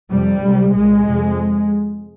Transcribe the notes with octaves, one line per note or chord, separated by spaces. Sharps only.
F2 C3 G3
D2 C3
C2 A#2 G#3
F2 C3